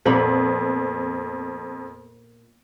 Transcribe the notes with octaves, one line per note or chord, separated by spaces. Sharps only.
F2 A#2 B3 B4